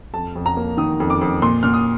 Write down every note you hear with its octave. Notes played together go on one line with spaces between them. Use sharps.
F2 A5
F2
A#5
A#3
D#3 D#6
F2
D6
F2
A#2 C6
A#2 F6
D#6